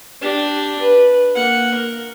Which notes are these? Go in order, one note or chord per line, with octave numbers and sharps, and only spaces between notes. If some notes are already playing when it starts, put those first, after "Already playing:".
D4 G4
B4
A#3 F#5
A#4